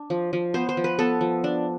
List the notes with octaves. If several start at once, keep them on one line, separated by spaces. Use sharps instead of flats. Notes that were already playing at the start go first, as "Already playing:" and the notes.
Already playing: D4
F3
F3
B3 C5
C5
F3
B4
B3 A4
F3
D4